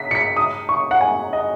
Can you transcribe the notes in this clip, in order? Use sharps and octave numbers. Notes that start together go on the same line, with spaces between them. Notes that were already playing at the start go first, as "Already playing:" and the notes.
Already playing: B6
C#7
B6
D#6
C#6
F#5
G#5
D#5